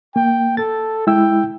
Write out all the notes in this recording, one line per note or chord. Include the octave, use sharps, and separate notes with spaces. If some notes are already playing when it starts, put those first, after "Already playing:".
A#3 G5
A4 A6
G#3 E4 G5 E6